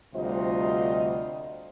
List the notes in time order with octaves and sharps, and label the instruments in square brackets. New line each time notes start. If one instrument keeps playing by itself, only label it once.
[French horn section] D2 C3 G3 F4 C5 D#5